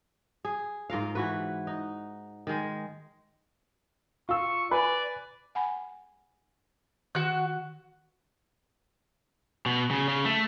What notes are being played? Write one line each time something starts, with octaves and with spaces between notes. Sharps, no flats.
G#4
G#2 F4 A#4 F5
E3 F#4 B4
D#4
D#3 G#3
F4 C#6 E6
B4 D5 G#5
F#5 G#5 B5
D#3 F#4 F#6
B2
C#3
C#3
A3